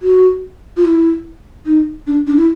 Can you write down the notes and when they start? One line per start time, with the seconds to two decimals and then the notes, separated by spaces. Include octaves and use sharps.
0.02 F#4
0.77 F4
0.85 E4
1.66 D#4
2.07 D4
2.27 D4
2.37 E4